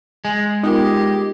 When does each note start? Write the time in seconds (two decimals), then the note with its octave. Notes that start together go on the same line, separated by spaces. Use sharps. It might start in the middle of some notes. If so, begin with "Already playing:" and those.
0.25 G#3 G#5
0.63 B3 D#4 F4 G4 A#4